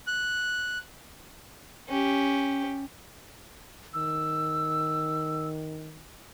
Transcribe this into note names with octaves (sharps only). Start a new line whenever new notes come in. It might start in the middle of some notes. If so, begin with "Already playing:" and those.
F#6
C#4 G4
D#3 E6